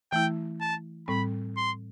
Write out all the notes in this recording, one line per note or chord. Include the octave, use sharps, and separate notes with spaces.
E3 A3 E4 G5
A5
A2 G3 C4 B5
C6